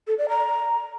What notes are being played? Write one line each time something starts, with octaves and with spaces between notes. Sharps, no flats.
A4
D5
A#5